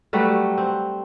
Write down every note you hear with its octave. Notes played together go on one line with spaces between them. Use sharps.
F#3 G3 A3 B4
C4